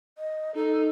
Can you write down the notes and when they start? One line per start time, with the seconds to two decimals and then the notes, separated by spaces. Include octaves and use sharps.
0.18 D#5
0.55 D#4 A4